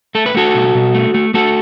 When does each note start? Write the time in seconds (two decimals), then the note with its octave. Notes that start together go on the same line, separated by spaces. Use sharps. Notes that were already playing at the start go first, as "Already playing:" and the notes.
0.15 A3 A4
0.26 B4
0.34 A3 F#4 A4
0.54 B2
0.75 B2
0.95 A3
1.14 A3
1.34 A3 F#4 A4